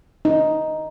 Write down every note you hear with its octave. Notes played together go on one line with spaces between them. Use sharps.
D#4